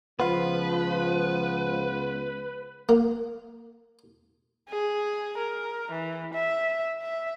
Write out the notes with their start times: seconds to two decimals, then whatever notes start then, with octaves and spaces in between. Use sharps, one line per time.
0.20 C#2 F3 B3 F4 B4
2.89 A#3
4.69 G#4
5.38 A#4
5.91 E3
6.34 E5
7.02 E5